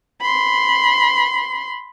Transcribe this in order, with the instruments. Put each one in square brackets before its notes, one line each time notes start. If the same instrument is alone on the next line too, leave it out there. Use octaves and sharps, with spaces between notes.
[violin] B5 C6